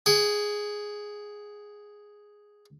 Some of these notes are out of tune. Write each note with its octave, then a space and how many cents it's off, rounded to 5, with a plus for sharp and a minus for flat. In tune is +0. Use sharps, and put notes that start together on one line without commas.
G#4 +0 F#5 +40